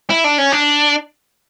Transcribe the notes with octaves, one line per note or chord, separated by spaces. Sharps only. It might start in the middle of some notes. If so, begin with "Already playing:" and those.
E4
D4
C#4
D4